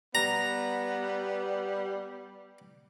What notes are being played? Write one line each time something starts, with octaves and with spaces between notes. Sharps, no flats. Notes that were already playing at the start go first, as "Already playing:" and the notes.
G3 B3 A#5